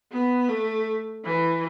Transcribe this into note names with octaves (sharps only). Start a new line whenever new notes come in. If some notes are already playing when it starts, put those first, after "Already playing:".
B3
A3
E3